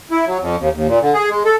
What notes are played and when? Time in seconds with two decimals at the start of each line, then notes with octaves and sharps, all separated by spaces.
0.11 E4
0.27 F#3
0.41 F2
0.59 D#2
0.74 D#2
0.88 A#2
1.01 D3
1.14 G#4
1.30 G#3
1.45 A4